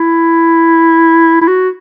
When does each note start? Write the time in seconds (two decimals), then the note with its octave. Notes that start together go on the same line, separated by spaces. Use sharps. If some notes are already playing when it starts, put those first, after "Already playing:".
Already playing: E4
1.42 E4
1.48 F#4